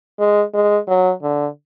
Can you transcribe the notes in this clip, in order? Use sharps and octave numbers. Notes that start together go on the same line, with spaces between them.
G#3
G#3
F#3
D3